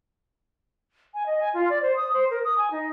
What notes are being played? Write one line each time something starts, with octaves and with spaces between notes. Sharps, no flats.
G#5
D#5
G#5
F4
D5
C5
D#6
C5
A#4
D#6
G#5
D#4